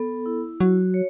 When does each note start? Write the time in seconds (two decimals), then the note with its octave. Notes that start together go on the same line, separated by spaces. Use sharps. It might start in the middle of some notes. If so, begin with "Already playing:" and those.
Already playing: B3 A4
0.26 E4
0.60 F#3 F#4
0.94 C#5